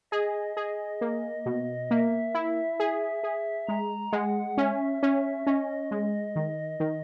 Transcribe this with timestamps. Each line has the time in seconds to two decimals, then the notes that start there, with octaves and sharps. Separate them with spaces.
0.12 G#4 D#5
0.57 G#4
1.01 A#3
1.46 B2
1.91 A#3 E5
2.34 E4
2.80 G#4
3.23 G#4
3.68 G#3 A#5
4.12 G#3 F#5
4.57 C#4 E5
5.03 C#4
5.46 C#4 D#5
5.91 G#3
6.36 D#3
6.80 D#3